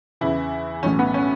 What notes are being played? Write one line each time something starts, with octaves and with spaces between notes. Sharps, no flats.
E2 C#3 E3 E4
B1 A2 E3 C#4
B3
C#4